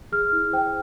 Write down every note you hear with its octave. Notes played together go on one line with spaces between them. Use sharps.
G#4 F6
E4
C5 G5